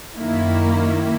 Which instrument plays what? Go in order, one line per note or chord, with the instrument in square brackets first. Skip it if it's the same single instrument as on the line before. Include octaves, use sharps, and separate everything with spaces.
[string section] F#2 D#3 A#3 E4